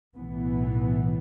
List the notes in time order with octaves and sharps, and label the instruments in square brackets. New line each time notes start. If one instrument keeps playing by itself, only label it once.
[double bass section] B1 A2 E3 B3